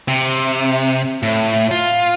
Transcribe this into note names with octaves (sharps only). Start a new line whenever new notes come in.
C3
A2
F4